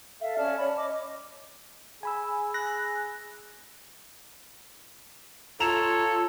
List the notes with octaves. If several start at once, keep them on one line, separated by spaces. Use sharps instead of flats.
A4 E5 F5
C#4 D5 A5 F6
C#5 B5
D#5 D6
G#4 G#5 B5 E6
F#6 A#6
F4 A4 C#5 A#5 E7 F7